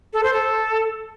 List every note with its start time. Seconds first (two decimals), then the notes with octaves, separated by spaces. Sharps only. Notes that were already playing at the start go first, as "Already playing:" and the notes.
0.13 A4
0.23 C5
0.34 A4